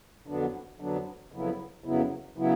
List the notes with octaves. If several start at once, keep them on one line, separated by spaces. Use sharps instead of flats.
F2 D3 F#3 B3 D4
F2 D3 F#3 B3 D4
F2 C#3 F#3 B3 E4
F2 C#3 F#3 B3 E4
C#3 F#3 B3 E4